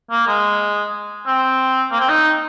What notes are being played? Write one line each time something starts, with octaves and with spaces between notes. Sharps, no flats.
A#3
G#3
C4
A#3
C4
D#4